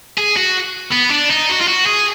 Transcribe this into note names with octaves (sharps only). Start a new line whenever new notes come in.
G#4
F#4
B3
D4
D#4
F#4
F4
F#4
G#4